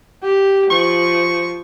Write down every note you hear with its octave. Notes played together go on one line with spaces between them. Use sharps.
G4
F3 C#6